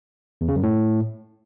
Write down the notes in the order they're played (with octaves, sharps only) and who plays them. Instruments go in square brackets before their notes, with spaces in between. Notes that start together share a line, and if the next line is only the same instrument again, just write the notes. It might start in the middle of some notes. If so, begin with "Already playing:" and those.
[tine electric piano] E2
C#3
F#2
A2